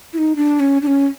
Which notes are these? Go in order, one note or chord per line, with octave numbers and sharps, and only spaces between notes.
E4
D#4
D4
C#4
D4
C#4